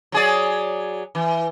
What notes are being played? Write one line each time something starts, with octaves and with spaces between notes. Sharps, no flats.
F#3 G#4 D5
E3